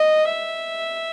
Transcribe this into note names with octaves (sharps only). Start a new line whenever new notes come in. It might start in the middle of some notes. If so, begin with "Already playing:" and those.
Already playing: D#5
E5